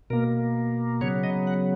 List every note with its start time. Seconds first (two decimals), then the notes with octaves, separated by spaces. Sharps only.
0.10 B2 A#3 A#4
1.01 C#3 F#3 B3 C#5
1.24 D#5
1.47 F#5